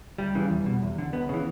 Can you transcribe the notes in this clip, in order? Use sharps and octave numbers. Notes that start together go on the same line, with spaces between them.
D2 G3
C#3 E3
E2
B2
E2
D3
C#2 B3
C#3 E3